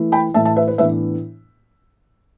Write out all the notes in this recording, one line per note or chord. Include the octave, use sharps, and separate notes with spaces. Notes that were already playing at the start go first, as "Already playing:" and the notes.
Already playing: E3 A3 E4
G5 B5
A2 E3 A3 E4 E5 A5
E5 A5
B4 E5
B4
A2 E3 B3 D4 B4 E5